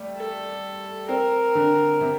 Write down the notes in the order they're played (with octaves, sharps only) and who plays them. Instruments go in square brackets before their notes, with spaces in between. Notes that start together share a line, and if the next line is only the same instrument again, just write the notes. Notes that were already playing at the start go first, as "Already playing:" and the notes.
Already playing: [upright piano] G3 A3
[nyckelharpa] A4
[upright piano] C4 [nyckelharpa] A#4
[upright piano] D3
C3